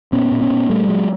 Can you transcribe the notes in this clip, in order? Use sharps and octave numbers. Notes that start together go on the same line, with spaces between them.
A#2 B3 C#4
A#2
B3 C#4
A#2
A#2 G3 A3
A#2 F#3 G#3